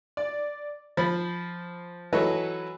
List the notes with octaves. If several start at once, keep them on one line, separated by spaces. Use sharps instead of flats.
D5
F3 C5 B5
E3 F#3 A4 B4 C#5 D#5